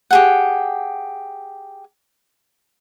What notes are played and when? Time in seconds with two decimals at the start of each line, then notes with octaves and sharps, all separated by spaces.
0.11 G4 G#4 F#5